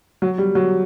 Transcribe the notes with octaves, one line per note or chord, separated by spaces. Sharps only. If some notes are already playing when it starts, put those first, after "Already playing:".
F#3
G3
F#3